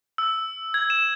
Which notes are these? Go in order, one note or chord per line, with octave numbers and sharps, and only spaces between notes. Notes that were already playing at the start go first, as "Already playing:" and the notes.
E6
G#6
E7